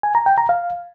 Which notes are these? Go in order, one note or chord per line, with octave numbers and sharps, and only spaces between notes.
G#5
A#5
G5
A#5
F5